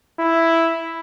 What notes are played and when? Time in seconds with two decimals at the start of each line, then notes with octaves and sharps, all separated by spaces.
0.19 E4